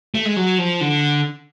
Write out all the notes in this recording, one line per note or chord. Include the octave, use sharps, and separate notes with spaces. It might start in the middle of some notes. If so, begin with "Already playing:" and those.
A3
G#3
F#3
F3
D3